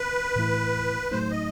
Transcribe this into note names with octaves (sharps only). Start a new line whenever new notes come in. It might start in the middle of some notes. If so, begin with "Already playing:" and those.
Already playing: B4
A2 E3 A3 E4
A2 F#3 A3 D#4 C5
D#5